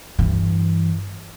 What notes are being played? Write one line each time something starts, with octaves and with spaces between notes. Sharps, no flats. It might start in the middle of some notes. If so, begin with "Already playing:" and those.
G2 E3